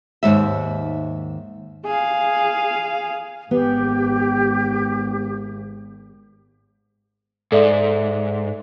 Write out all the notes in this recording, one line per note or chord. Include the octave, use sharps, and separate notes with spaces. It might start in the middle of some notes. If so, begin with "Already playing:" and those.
D#2 G#2 E5
G#4 F5
G#1 B3 G4
G#2 A4 D5 E5